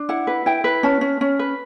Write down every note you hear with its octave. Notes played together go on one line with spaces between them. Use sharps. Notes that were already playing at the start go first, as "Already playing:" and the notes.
Already playing: D4
E4 F#5
B4
E4 G5
B4
C#4 A5
C#4
C#4
B4